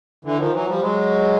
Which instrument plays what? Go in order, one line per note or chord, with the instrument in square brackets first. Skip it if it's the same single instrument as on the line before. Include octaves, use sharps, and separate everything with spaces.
[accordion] D3 E3
D#3 F3
E3 F#3
F3 G3
F#3 G#3